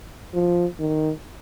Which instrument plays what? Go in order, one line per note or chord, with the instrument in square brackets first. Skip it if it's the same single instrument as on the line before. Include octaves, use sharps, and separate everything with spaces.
[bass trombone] F3
D#3